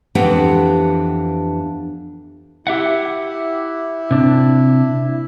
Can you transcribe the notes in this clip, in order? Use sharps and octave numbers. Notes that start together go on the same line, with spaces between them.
F2 E3 B3 D4 G4 F#5
E4 G4 E5 F#5
C3 D4